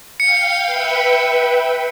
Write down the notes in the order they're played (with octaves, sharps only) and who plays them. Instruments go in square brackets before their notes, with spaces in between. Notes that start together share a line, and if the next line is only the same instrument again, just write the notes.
[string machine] F5 G5 [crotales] C#7
[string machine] B4 E5 G5